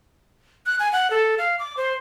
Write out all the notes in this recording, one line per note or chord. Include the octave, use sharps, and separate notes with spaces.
F#6
G#5
F#5
A4
F5
D6
C5